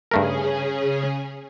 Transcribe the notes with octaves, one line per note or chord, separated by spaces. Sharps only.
G2 C#3 A3 C#4 G#4 A#4